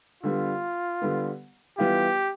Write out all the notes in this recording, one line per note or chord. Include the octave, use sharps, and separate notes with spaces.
D3 G3 B3 F4
D3 G3 B3
E3 G3 B3 F4 G4